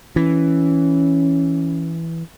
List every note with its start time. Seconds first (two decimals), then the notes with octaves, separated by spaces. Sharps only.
0.16 E3 C#4